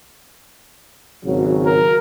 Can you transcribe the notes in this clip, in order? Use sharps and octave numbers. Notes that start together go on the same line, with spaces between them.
G#1 C#3 F#3
A#4